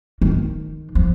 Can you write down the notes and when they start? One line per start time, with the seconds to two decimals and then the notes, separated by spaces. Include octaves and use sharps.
0.22 D#3
0.95 F3